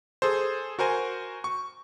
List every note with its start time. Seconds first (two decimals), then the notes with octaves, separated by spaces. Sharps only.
0.22 G#4 A4 C5
0.79 F#4 A#4 C5 G#5
1.44 C#6